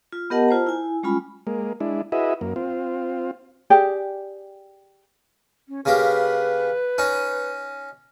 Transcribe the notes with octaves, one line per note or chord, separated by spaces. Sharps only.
F4
B3 G4 A#4 D#5 F#5 A5
F4 C5 A5 A#5
E4 G#5
G3 G#3 C#4 F4 B5
G#3 A#3
G#3 D4 E4
E4 F#4 G#4 B4 D#5 E5
F#2 A#3
C4 F4
G4 G#4 D5 G5
C#4
C#3 A#3 G4 B4
C#4 D#4